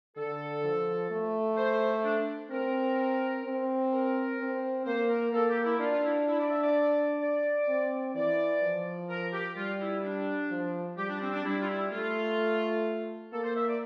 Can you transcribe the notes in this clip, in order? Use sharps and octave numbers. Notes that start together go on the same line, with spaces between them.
D3 A4
F3
A3
C5
D4
C4 A#4
C4
A#4
C4
A#3 C5
A#4
A#3 A4
G4
E4
D4 F4
F4
E4
E4
D5
E5
D5
D5
C4
E3 D5
F3
A#4
G4
G3 F4
E4
D4
F3
G3 G4
D4
C4
D4
G3 E4
F4
E4
A3 F4
A#3 A4
C5
E5
D5